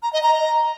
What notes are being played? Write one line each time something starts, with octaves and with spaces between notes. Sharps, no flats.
A#5
D#5
A#5